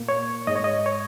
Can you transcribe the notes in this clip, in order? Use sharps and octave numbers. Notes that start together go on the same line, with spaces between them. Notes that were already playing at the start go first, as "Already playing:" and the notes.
Already playing: A#2 A#3
C#5
G#2 G#3 D#5
C#5
D#5
C#5